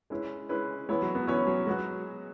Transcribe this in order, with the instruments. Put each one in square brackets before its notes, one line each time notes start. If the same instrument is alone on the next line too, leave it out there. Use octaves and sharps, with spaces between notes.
[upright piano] G#3 C#4 E4 B4
G#3 C#4 E4 B4
[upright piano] E3 B3 E4 C#5 [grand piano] G#3
[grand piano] F#3
B3
[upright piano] E3 B3 E4 C#5 [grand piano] C#4
[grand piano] F#3
[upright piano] F#3 B3 F#4 [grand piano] G#3